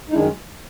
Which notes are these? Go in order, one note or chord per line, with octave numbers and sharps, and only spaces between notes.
D#4
F#2 D#3 G#3 D4 E4